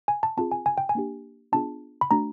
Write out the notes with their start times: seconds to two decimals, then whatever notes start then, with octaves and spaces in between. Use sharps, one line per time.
0.08 G#5
0.23 A5
0.37 C4 F4 G#4 A5
0.52 G#5
0.66 G#5
0.78 G5
0.89 G#5
0.95 A#3 D4 G4
1.52 B3 D4 F4 G#4 A5
2.01 B5
2.11 A3 D4 F#4 A#5